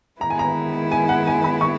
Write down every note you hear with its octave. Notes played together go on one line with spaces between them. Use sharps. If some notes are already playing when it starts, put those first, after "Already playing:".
D#3 G#3 B3 E4 A#5
G#5
A#5
G#5
F#5
G#5
B5
C#6